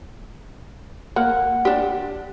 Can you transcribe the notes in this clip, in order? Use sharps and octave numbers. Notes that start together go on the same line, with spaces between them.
A#3 F#5
D4 G4